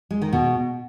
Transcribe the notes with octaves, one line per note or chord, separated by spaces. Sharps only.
G#3
D#3
B2